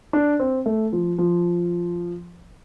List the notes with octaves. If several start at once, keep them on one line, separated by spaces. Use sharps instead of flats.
D4
C4
A3
F3
F3